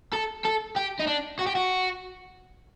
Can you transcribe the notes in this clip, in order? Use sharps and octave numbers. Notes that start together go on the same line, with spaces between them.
A4
A4
G4
D#4
D4
F#4
G4
F#4